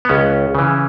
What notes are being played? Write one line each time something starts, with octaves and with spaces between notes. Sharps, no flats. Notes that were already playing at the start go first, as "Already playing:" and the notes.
B3
C#2 C#4
C#3 E3